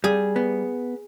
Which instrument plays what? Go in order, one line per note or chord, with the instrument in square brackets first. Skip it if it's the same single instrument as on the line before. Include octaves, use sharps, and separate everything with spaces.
[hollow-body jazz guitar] G3 [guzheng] G#4
[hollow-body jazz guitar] B3